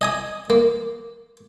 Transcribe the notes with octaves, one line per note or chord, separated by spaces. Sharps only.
D#5 G#5 D#6
A#3